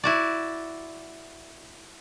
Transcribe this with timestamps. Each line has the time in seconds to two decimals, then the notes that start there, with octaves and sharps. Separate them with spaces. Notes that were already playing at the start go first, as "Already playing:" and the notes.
0.03 E4 F#4 D5